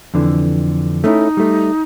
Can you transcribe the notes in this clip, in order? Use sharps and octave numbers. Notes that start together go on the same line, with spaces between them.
F2 D3 E3
A3 C#4 D#4 E4
G3 A3